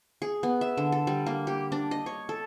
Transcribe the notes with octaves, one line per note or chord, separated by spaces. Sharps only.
G#4
B3
E5
D3
A4
G3
A#3
G4
D4
D#5
C#5
A4